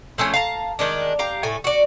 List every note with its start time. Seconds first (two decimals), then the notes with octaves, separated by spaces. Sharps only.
0.18 F3 A3 C#4 G#4
0.34 F5 A5 A#5
0.79 D#3 G#3 D4
1.19 G4 F5 A#5
1.43 A2 A3 G#5
1.64 F#4 D5